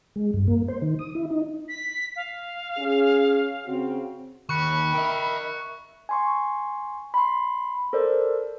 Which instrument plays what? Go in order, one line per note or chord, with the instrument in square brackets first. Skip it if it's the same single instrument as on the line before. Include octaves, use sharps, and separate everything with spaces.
[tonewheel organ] G#3
G2
A#3
C5
D#3
D#6
E4
D#4
[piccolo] B6
F5
[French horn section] C#4 G#4
C#3 C4 F#4
[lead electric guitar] D#2 [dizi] B5 [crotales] C#6 F#6 C#7
[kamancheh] A#4 E5 [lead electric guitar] D#5 G5
[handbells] G#5 C6 C#6
B5 C6
A4 A#4 C5 D5